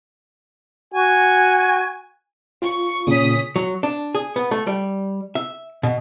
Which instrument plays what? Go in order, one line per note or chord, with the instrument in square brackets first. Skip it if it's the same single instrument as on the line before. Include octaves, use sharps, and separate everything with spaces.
[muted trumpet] F#4 [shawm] G#5
[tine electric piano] F4 [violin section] C#6
[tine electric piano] A#2 C#3 [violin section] C#4 D#6 B6
[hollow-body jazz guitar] F#3
D4
G#4
B3
A3
G3
E5
B2